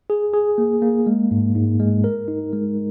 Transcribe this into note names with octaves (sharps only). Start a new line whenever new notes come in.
G#4
G#4
A#3
A#3
G#3
G#2
G#2
G#3
A#4
D#4
G#3